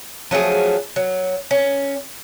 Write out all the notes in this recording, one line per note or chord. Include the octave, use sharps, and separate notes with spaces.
F3 F#3 A3 G#4
F#3
C#4